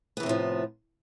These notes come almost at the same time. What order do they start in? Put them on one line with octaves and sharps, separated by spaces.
B3 E3 C3 A2 F3